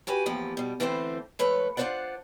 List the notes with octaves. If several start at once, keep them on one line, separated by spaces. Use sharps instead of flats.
F#4 G4 B4 G#5
E2 A2 F3 A#3 G4
B2 G3
D3 E3 A3 C4 G#4 C5
G#2 F3 A3 B4 C#5
D4 F4 F#4 C5 D5 F#5